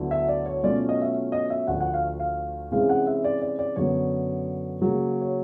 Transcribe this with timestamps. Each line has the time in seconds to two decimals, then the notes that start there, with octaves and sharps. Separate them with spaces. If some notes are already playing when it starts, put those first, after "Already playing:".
Already playing: D2 D3 F#3 B3 E4
0.11 E5
0.28 D5
0.46 C#5
0.63 B2 F#3 A3 C#4 F4 D5
0.89 D#5
1.02 E5
1.32 D#5
1.50 E5
1.67 D2 D3 F3 F#5
1.80 F#5
1.94 F5
2.20 F5
2.72 C3 E3 G#3 C#4 E4 F5
2.89 F#5
3.07 E5
3.24 D5
3.41 D5
3.59 D5
3.76 F#2 D3 F#3 B3 C#5
4.81 C#3 F#3 A#3
5.21 C#5